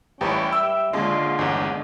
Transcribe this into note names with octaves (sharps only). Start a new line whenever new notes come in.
A1 A2 G3 C#4 G4 B4 G5 B5
E5 E6
A#1 D#2 D3 G#3 D4 F4
G1 E2